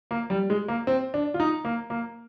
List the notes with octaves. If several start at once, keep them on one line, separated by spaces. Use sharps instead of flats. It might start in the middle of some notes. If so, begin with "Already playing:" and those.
A#3
G3
G#3
A#3
C4
D4
F4
D#4
A#3
A#3